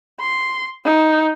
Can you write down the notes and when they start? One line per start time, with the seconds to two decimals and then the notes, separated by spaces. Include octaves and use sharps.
0.20 C6
0.85 D#4